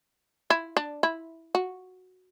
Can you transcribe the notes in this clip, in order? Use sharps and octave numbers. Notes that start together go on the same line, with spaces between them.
E4
D4
E4
F#4